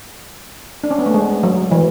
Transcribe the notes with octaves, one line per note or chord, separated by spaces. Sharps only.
D4
C#4
B3
A3
G#3
F#3
E3